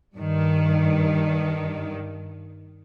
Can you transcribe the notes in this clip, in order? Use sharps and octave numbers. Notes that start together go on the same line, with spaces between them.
G2 D#3